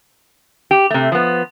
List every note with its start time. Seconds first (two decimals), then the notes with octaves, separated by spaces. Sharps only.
0.71 G4
0.91 C3 A3
1.12 F3 B3